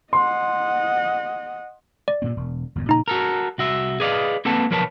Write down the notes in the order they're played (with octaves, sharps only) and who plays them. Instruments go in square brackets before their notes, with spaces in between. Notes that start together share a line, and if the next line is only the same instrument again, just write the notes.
[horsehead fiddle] D#5 F#5 [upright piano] C6
[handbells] D5
[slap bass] G2 A#2 C4
E1
G1 E2 A2
[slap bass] A#2 C#3 F3 [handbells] D#4 A#5
[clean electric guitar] F#4 A4 A#4
C2 F#4 E5
G#4 B4 D5 D#5 F5
A#3 C4 A4 B4 F#5 A5
B1 F3 A#4 B4 C#5 A5